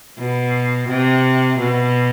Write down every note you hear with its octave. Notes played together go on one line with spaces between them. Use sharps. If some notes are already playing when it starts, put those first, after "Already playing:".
B2
C3
B2